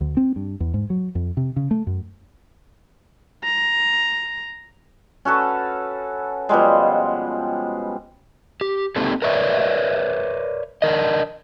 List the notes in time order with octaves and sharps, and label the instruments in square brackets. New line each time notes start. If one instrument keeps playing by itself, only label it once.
[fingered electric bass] D2
C4
G2
E2
G#2
F#3
F2
C3
C#3
A3
F#2
[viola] A#5
[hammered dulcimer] C#4 F#4 A4 B4
B2 F3 G3 G#3
[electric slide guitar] G4
A#3 C4 D#4 G4 A4
A#4 B4 C#5 D5 E5
D4 A#4 D#5